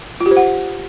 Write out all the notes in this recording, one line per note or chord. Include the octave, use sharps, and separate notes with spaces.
F4
G4
C5
F#5